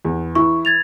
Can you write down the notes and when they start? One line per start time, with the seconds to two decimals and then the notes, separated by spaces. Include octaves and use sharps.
0.05 E2
0.35 E3 E4 C#6
0.65 G#6 A6 F7